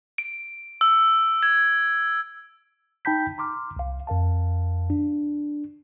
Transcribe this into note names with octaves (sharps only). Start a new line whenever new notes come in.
D7
E6
G#6
D#4 G5 A5 B5 G6 B6
A#5 C6 D6 F6
C2 F5
F2 A#4 F5 A5
D4